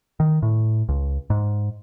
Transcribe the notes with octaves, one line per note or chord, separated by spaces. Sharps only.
D#3
A2
C#2
G#2